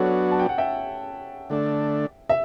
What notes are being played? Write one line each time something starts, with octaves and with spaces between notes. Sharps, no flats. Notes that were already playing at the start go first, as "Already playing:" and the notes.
Already playing: F#3 B3 D4 F#4 A4 C#5
A5
G5
F#5
E5 G5
D3 A3 D4
E5